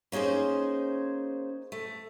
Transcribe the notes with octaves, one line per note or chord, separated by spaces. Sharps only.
A#3 C#4 D#4 G#4 C5
A3